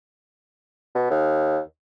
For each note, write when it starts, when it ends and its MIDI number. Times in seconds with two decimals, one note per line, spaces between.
0.95 1.07 47
1.10 1.59 39